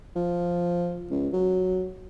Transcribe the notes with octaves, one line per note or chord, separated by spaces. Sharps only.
F3
C#2
F#3